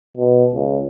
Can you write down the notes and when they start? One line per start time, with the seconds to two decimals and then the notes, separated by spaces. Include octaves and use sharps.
0.17 B2
0.54 C#2